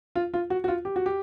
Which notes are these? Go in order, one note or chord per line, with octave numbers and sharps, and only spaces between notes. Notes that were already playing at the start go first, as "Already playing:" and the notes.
F4
F4
F#4
F#4
F4
G4
F#4
G4